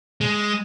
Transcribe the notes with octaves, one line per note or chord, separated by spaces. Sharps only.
G#3